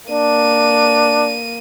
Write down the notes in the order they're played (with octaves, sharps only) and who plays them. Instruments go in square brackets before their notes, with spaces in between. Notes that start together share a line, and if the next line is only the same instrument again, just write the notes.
[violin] A#3 D#7 [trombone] D4